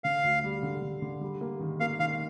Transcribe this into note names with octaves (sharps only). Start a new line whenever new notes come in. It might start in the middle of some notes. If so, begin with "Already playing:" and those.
D3 F5
D2
G3
D3
D3
D3
G3
A#3
D#3
A#3 F5
D#3 F5